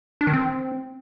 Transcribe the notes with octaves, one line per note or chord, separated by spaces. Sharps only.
D4
D#3
C4